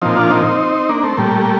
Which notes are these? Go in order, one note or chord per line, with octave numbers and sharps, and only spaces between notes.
A#2 F3 C4 D#4
D4 F4
C4 D#4
A#3 D4
A3 C4
A#2 G3 A3